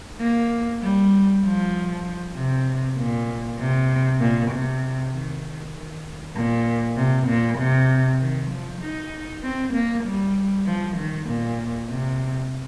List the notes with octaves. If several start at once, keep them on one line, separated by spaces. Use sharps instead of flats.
A#3
G3
F3
C3
A#2
C3
A#2
C3
D#3
D#3
A#2
C3
A#2
C3
D#3
F3
D#4
C4
A#3
G3
F3
D#3
A#2
C3